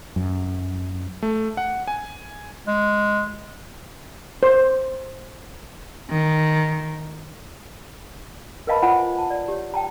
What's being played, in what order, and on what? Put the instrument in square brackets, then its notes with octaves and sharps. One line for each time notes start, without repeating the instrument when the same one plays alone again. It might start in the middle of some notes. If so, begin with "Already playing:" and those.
[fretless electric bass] F#2
[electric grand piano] A3
F#5
G#5
[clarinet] G#3
[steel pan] C5
[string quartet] D#3
[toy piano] A#4 B4 D#5 F5 A5 B5
F4 C5 C#5 F#5 G#5 B5
A5
D5
G4 C#5
G5 A5 A#5